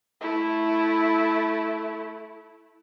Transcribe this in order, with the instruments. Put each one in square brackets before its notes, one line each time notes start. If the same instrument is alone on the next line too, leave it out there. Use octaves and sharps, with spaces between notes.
[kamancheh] A3 E4